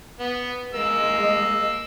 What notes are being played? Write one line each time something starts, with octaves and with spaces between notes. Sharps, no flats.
B3
G#3 A#3 D#5 E6